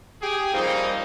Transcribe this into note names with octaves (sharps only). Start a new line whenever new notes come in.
G4 G#4
F3 G3 A#3 C4 D#4